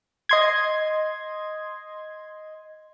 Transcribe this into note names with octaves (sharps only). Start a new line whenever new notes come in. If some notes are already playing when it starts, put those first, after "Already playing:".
D#5 C6 G#6